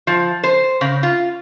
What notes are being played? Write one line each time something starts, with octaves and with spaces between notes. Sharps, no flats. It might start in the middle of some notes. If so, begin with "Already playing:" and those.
F3
C5
C#3
F4